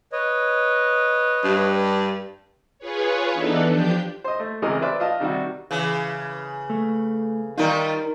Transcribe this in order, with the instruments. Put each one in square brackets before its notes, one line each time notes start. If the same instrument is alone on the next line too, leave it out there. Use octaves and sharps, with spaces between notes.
[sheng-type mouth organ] B4 C#5 D#5
[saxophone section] G2
[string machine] F4 G#4 B4 C#5
E3 B3 D4 D#4 A4 B4
F3 D4 G4 G6
[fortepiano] C5 D#5
A3
C#2 C3 E3 G#3 A#4 D#5
B4 C5 D5 E5
F4 D#5 A5
C3 D#3 G3 F#4
[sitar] C#3 E3
[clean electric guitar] A3
[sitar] D#3 G3 F4 [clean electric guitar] D#4 A#4